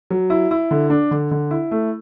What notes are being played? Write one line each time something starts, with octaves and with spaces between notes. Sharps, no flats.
F#3
E4
E4
D3
D4
D3
D3
E4
A3